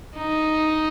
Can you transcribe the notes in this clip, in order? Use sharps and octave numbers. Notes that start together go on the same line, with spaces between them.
D#4